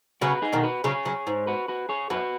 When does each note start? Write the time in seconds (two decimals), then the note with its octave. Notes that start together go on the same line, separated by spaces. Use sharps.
0.21 C#3 F#3 F#4 B4
0.42 D#4 G#4
0.53 B2 D#3
0.64 F#4 B4
0.84 C#3 F#3 G#4 C#5
1.05 C#3 F#3
1.27 G#2
1.47 F#4 B4
1.68 F#4 B4
1.89 G#4 C#5
2.10 F#2 F#4 B4